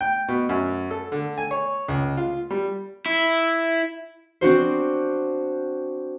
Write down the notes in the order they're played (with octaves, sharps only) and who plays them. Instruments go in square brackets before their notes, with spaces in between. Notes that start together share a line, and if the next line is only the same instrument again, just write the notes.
[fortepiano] G5
B2
F#2
A4
D3
G#5
C#5
C#2
F4
G3
[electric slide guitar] E4
[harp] C4 D4 F#4 C5